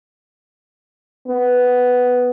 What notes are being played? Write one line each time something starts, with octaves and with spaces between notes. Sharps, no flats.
B3